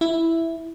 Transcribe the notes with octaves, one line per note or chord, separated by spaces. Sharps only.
E4